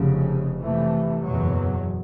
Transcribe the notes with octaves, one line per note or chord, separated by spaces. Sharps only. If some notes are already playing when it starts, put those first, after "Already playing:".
Already playing: F1 F2 C#3
F2 C3 E3 A3
F#1 E2 B2 F#3